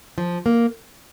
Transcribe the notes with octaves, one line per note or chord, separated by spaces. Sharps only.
F3
A#3